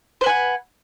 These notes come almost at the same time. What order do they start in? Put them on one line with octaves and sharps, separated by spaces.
C5 B4 G#5 F#5